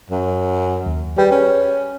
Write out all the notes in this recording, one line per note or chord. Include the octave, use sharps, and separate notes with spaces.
F#2
D#2
G3 G#4 B4 G5
C#4